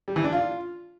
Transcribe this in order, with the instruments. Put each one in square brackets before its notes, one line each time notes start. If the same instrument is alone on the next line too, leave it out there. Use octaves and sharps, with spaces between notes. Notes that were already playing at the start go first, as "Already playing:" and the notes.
[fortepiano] G3
E3
D4
F4